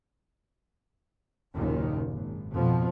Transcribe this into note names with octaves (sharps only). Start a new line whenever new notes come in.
F#1 D#2 A#2 D#3
G#1
F2 B2 F3